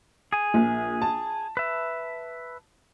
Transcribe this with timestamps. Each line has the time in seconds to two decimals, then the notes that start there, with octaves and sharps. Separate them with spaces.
0.33 G#4 G#5
0.54 A#1
1.02 A5
1.57 B4 E5